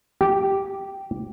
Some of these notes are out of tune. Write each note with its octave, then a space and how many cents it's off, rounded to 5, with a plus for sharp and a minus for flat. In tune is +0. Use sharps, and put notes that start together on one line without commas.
G4 -10